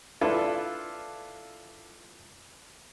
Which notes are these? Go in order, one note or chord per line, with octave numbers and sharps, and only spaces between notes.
D4 E4 F4 A4 B4